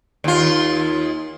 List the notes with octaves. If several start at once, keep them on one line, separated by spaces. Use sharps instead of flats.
D#2 F4